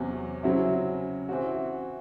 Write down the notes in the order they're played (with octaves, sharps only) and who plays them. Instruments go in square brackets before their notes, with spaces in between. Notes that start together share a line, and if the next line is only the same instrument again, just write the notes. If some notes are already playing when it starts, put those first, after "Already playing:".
Already playing: [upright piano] E2 C3 F#3 C#4
C#3 F#3 C4 E4
E3 C4 F#4